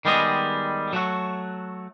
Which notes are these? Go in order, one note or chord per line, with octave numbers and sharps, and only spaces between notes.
D#3 G3 G#3 B3 G#4 D#5
F#3 A3 F#4